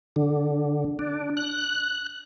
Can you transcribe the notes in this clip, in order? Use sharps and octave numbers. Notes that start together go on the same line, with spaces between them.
D3
D4
F#6